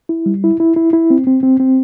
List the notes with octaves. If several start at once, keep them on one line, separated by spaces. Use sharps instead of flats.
E4
G3
E4
E4
E4
E4
C4
C4
C4
C4